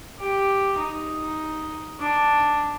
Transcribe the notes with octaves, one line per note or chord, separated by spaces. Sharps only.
G4
D#4
D4